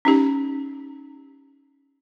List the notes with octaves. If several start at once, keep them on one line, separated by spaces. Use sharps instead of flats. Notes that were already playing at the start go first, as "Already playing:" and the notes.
C#4 D#4 G4